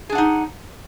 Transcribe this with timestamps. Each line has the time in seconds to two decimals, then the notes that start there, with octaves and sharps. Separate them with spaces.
0.09 G#4
0.12 D4
0.15 F#5
0.18 D#4